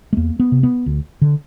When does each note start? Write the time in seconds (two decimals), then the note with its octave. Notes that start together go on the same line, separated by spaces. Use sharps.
0.13 A3
0.17 E2 A#3
0.40 B3
0.52 C3
0.63 B3
0.86 D2
1.22 D3